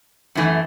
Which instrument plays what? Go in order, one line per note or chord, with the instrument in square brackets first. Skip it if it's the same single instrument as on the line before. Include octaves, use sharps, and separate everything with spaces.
[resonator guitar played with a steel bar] F#2 E3 A3